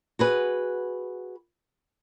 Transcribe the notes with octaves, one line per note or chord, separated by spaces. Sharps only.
F#4 G#4 B4